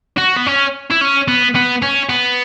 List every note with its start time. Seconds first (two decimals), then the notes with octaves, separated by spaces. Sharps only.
0.18 F#4
0.37 B3
0.47 C#4
0.91 E4
1.01 C#4
1.28 B3
1.55 B3
1.82 C#4
2.10 B3